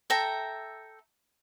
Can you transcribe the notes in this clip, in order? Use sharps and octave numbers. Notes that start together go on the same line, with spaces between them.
A4 E5 G5 A#5